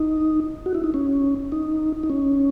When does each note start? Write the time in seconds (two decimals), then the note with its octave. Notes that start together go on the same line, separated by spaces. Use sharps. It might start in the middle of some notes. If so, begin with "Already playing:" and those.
Already playing: D#4
0.66 F#4
0.75 E4
0.84 D#4
0.94 C#4
1.52 D#4
2.03 D#4
2.10 C#4